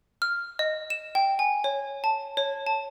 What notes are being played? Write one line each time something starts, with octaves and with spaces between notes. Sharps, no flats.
F6
D#5
E7
G5
G#5
C#5
A5
C#5
A5